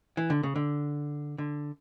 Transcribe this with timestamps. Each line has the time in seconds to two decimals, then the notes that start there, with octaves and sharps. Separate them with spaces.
0.17 E3
0.30 D3
0.43 C#3
0.56 D3
1.38 D3